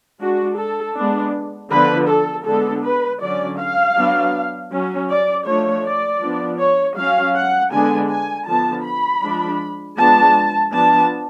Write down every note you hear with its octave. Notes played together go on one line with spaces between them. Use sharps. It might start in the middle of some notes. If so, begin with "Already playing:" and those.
G#3 D4 F#4
A4
G#3 B3 D4
D3 F3 B3 D4 B4
A4
D3 G#3 B3 D4 A4
B4
D3 F#3 C#4 D5
F5
F#3 B3 D4
F#3 C#4
D5
F3 A3 D4 C#5
D5
F3 B3 D4
C#5
F#3 C#4 F5
F#5
D3 G#3 B3 D4 G#5
G#5
D3 F3 B3 A5
B5
F3 G#3 D4
F3 G#3 B3 D4 A5
F3 B3 D4 A5